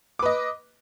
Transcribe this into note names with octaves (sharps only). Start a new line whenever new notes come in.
B4 D#5 D6